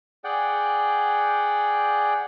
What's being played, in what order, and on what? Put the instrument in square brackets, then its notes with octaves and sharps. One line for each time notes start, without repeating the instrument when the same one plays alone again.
[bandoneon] G#4 D5 F#5 G5